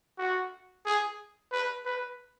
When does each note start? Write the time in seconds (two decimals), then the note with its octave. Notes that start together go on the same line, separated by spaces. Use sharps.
0.18 F#4
0.86 G#4
1.52 B4
1.85 B4